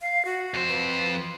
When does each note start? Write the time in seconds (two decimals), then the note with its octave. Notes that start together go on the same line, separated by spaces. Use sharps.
0.01 F5
0.25 F#4
0.54 F2 C5
0.68 B4